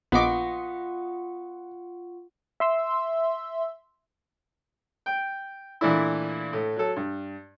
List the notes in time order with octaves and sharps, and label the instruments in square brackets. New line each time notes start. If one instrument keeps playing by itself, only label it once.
[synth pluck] A#1 D6 [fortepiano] B3 D#5 [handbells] F4 F#5 C#6
[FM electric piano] E5 C6 E6
[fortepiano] G5
A#2 E3 A3 D4 E4
A2 A3
F#3 A4
G2